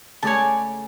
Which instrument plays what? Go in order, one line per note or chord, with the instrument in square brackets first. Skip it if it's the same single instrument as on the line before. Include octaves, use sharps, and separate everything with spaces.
[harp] C#3 A3 G#4 [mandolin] C#5 D5 A5